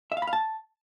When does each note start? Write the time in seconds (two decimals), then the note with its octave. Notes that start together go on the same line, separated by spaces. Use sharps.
0.12 E5
0.17 F5
0.22 B5
0.27 F5
0.33 A5